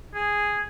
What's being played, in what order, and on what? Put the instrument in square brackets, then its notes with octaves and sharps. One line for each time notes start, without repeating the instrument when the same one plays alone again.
[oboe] G#4